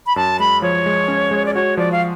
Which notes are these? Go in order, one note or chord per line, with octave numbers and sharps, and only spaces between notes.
B5
F#2 A5
G#3 B5
F3 C#5
G#3
C#4
G#3
D5
F#4 C#5
F3 D5
F5